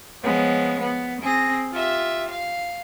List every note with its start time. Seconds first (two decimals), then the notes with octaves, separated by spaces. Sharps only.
0.22 F3 G#3 B3 C#5
0.79 B3
1.21 C4 G#4 A#6
1.72 F4 G4 E5
2.28 F5